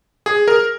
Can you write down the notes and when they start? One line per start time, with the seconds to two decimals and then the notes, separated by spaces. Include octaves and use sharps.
0.26 G#4
0.48 A#4